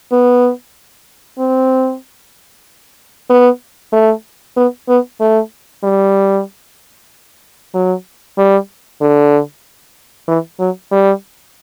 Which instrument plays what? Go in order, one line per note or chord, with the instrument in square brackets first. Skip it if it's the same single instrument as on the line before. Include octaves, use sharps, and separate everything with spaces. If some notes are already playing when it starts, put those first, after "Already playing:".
[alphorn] B3
C4
B3
A3
B3
B3
A3
G3
F#3
G3
D3
E3
F#3
G3